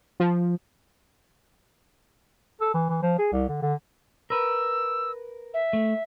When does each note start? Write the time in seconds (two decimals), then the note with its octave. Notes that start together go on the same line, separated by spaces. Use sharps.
0.20 F3
2.61 A4
2.74 E3
2.89 E3
3.03 F3
3.19 G#4
3.32 C2
3.49 D3
3.62 D3
4.30 A#4 B4 E6
5.54 E5
5.73 A3